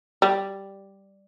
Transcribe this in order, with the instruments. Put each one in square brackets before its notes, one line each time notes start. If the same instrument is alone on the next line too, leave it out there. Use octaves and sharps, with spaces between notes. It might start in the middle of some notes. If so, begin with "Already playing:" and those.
[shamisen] G3